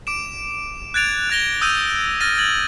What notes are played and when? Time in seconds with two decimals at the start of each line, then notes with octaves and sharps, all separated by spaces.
0.07 D6 D7 E7
0.94 F#6 G#6 A6 D7 F7
1.30 F#6 G#6 A#6 F7 G7
1.61 D#6 E6 G6 D#7
2.20 F6 A6 A#6 D#7
2.38 G#6 A6 F#7